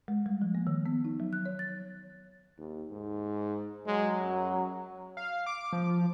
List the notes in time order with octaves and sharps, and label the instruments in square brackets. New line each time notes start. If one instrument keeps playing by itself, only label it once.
[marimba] G#3
G3
F3
A#3
D#3
B3
D#4
F#3
F#6
C#5
A6
[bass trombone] D#2
G#2
[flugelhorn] F#3 [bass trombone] G#3
[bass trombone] F#2
[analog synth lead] F5
D6
F3